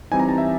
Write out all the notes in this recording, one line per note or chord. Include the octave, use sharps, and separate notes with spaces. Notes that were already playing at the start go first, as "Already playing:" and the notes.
E3 G3 C4 D#4 G#5
A#5
A5
E5